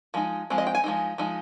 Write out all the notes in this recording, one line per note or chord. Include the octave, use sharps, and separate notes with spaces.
F3 G#3 D#4
F3 G#3 C4
D#5
G5
G#5
F3 G#3 D#4
F3 G#3 D#4